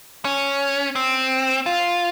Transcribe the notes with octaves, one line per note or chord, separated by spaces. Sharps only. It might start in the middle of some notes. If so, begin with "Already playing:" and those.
C#4
C4
F4